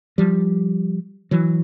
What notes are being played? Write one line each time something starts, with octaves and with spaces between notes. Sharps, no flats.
F3 G3
E3 F#3